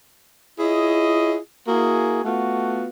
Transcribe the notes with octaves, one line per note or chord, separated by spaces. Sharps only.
E4 F4 G#4 C#5 D#5
A#3 E4 F#4 G#4
A3 B3 F4 F#4